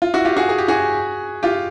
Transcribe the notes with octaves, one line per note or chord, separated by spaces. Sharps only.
F4
E4 F#4
F4 G4
F#4 G#4
G#4
G4
F#4 G#4
F4 G4